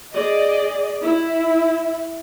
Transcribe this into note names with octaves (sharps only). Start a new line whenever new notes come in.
G#4 D5 D#5
E4